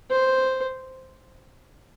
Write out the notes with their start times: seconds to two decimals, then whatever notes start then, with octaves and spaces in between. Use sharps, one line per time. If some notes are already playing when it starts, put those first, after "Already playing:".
0.11 C5